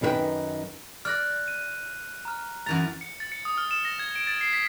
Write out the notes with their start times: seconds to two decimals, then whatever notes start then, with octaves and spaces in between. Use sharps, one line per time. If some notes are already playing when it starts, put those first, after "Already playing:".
0.01 F#2 D#3 D#4 A#4 B4 G5
1.05 D5 F6 F#6 A#6
1.48 D#7
2.25 A#5 F6
2.66 F#2 E3 A#5 A6
3.01 C#7
3.20 A6
3.32 C#7
3.45 D#6
3.58 F6
3.71 E7
3.85 A#6
3.99 G#6
4.16 D7
4.27 A6
4.41 C7
4.53 B6